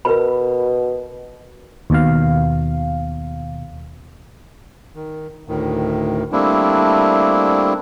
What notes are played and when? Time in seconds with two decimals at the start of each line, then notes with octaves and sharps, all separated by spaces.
0.05 B2 A#4 B4 B5
1.90 D#2 B2 F5
4.95 D#3
5.48 D2 A2 D#3
6.32 G3 A3 A#3 C4 D4 E4